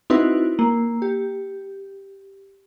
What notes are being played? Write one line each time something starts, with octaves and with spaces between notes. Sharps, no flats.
C4 D#4 E4 F#4 B4
A#3
G4